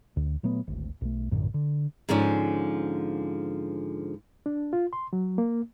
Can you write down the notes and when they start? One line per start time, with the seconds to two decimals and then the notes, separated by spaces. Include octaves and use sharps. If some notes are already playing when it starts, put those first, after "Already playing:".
0.16 D2
0.43 A#2 F#3 A3 B3
0.67 D1 G#1
1.01 B1 A3
1.32 A#1 F#2 A2 D3
1.54 D3
2.09 G#2 D3 F3 C#4
4.46 D4
4.73 F4
4.93 C6
5.13 F#3
5.38 A#3